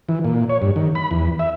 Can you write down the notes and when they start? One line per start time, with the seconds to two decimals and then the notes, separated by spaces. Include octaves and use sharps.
0.09 E3
0.25 A#2
0.49 C#5
0.62 G2
0.76 D#3
0.95 B5
1.11 E2
1.39 E5